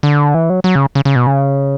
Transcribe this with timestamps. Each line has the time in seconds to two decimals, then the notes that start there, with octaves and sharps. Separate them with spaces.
0.03 D3
0.34 E3
0.50 F#3
0.64 F#3
0.75 C#3
0.95 C#3
1.05 C#3
1.16 B2
1.27 C#3